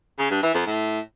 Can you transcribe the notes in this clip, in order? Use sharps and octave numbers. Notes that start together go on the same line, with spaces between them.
C#3
G2
E3
F2
A2